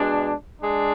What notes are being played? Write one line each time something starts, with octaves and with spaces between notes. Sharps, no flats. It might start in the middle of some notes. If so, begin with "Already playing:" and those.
Already playing: B2 G#3 D4
G#3 D4